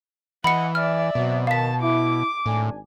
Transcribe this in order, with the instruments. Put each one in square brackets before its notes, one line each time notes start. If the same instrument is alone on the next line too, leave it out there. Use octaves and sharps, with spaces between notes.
[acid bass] E3 [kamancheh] D#5 F#5 [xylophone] B5 C#7
[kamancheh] D5 E5 [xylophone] F6
[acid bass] B2 [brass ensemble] F#3 C4
[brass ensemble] D#3 [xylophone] F5 B6 [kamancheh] A5
[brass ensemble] E4 [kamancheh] D6
[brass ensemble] G#1 D4 G#5 [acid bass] A2